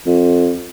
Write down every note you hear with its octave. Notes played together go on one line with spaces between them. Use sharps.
F2